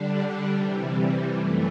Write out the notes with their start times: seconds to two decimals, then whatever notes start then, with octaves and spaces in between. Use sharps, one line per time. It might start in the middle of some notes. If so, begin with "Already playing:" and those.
Already playing: D3 G3 D4
0.53 C3 E3 G3
1.34 F#2 E3 A3